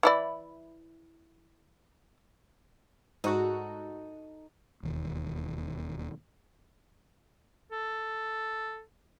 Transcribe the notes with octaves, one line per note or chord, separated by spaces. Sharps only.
E3 E4 D5
G#2 D#4 F#4 A4
E1 D#2
A4